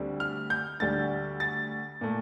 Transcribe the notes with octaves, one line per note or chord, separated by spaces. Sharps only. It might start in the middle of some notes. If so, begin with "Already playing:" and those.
Already playing: D2 D3 G3 C4
F6
G6
D2 D3 G3 A6
A6
A#2 A3